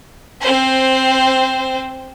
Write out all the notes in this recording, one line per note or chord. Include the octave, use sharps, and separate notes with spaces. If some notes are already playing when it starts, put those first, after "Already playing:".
C4 C5